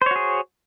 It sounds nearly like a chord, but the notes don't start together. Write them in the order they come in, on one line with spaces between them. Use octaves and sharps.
C5 C#5 F#4 G#4